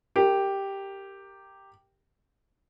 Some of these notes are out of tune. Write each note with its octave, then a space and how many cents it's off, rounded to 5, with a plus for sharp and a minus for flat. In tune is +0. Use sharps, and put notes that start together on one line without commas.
G4 +0 A#4 -20